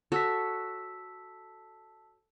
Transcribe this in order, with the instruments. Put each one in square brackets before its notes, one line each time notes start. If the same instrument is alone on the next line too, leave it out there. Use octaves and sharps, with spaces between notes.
[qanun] F#4 A4 C#5 [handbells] A5 E6 B6